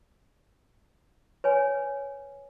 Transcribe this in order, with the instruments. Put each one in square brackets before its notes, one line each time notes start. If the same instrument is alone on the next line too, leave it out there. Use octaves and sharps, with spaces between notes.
[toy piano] B4 C#5 G#5